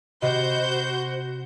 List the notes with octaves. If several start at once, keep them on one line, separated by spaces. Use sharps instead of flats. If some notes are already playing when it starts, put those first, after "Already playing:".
C3 F#4 C5 D#5 B5 G6